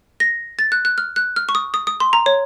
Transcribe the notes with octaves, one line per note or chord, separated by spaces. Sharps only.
A#6
A6
F#6
F#6
F6
F#6
F6
C#6
D#6
D#6
D#6
C6
A#5
C#5